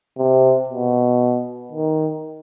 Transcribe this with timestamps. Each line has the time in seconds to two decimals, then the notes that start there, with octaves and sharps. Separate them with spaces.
0.18 C3
0.69 B2
1.72 D#3